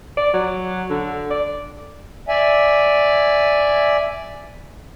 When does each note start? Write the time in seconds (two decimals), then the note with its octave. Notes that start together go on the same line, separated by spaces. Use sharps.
0.17 D5
0.33 F#3
0.90 D3
1.30 D5
2.28 D5 E5 G#5